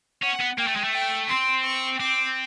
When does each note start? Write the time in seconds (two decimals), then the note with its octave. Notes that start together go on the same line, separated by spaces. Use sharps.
0.23 C#4 F#5
0.40 B3
0.58 A#3 G5
0.67 A3
0.76 G#3
0.84 A3
0.93 G5
1.29 C4 C6
1.64 C#6
1.99 C4 D6